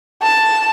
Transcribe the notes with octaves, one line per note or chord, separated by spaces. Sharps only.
A5